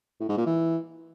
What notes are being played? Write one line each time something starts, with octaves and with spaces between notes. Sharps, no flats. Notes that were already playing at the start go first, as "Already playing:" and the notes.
A2
G#2
A#2
E3